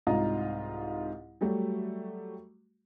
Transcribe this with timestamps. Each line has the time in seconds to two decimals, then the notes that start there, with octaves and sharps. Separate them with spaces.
0.07 C2 G#2 F4 D#5 A#5
1.41 F#3 G3 A3 F#4